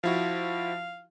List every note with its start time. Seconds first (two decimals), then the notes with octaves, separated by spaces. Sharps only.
0.04 F3 E4 F#4 F5